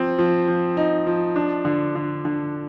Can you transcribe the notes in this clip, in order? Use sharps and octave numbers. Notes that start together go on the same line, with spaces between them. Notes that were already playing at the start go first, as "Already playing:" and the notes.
Already playing: F3 C4
F3
F3
D#4
F3
D4
D3
D3
D3